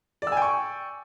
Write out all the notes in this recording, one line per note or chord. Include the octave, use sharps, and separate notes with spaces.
D5 G5 G#5 C#6 E6